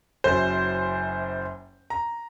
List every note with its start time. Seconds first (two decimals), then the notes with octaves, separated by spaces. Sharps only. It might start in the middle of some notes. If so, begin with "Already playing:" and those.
0.24 F#1 F#2 F#3 C5
1.90 A#5